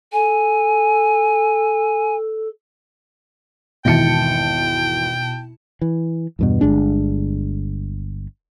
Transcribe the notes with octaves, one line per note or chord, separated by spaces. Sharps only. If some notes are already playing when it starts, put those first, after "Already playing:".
A4 G#5
G#1 E2 B2 E4 G5 A5 C#7
E3
E2 G2 B2
G1 G#3 D4